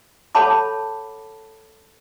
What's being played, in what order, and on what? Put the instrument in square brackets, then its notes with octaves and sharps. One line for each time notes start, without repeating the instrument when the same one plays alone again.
[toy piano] A4 C#5 F#5 A5 B5 D6